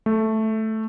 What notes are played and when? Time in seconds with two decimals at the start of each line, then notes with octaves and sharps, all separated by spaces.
0.06 A3